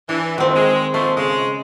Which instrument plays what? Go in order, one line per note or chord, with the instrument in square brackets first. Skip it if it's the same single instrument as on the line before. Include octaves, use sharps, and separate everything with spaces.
[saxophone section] E3 [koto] D4
[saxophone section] F2 [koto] D#3 C4
[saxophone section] G#3
[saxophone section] A#2 F3 A3 [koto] C5
[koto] C#3 [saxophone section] G#3